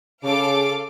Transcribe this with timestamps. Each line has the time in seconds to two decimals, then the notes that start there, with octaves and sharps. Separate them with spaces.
0.24 C#3 A4 F5 D6